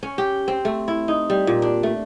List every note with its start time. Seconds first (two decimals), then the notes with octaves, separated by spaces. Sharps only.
0.03 C#4
0.18 G4
0.48 C4
0.65 A3
0.88 E4
1.08 D#4
1.30 G3
1.47 A#2
1.62 D4
1.83 A3